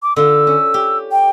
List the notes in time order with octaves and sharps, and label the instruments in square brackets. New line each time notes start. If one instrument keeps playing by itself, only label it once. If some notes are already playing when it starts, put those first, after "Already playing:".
[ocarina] D6
[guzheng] D3 F4 [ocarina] E6
[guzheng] C#4
G4
[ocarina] G5